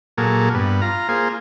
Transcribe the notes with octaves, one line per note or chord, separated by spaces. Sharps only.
A#2 F#3 A#3 G#4 A4
G2 B3
F4 A#5
A#3 F4 G#4 C5